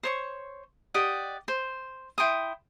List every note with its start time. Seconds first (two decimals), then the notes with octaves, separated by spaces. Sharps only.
0.03 C5 C#5 C#6
0.94 G4 D5 D#5 F#5
1.48 C5
2.18 E4 G5 C6 D#6